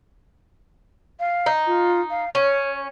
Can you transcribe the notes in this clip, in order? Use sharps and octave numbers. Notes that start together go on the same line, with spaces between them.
F5
D#4
F4
F5
C#4 C#5